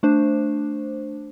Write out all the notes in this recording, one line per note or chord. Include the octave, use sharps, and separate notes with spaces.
A3 D4 C5